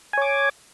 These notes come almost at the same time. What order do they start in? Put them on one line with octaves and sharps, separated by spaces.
G#5 C#5 D6